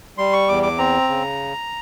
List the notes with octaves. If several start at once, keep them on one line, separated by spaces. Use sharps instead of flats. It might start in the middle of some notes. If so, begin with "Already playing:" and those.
G3 C6
C#6
E2 D6
D6
C4 A#5
C#3